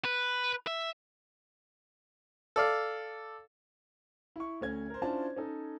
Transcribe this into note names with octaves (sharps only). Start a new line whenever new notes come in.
B4
E5
A4 D5 F5
E4 C#6
D2 A3 C#4 G#6
A#4 C5
C#4 D4 E4 F4 C5 A5
C#4 D#4 A4